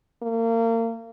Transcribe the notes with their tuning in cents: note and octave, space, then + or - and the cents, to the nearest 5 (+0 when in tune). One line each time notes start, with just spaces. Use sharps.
A#3 -35